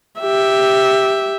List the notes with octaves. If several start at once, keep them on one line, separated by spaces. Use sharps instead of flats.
G4 E5